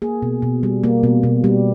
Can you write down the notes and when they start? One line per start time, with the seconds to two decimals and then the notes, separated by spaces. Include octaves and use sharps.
0.02 A#3 G#4
0.22 B2
0.42 B2
0.63 G3
0.84 A#3
1.03 B2
1.23 B2
1.44 G3